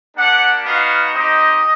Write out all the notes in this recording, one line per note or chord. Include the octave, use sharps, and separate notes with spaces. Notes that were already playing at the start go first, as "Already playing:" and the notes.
A#3 D4 G4 F#5
B3 D#4 F#4 F5
C4 D#4 G4 D#5